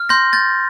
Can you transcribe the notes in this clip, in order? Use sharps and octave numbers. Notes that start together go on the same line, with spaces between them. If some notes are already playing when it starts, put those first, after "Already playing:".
Already playing: F6
C6 G6 A#6
G6 A6